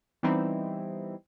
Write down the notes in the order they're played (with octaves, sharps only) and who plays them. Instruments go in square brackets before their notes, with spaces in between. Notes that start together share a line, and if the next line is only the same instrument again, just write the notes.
[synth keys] E3 G3 B3 C4 D#4 E4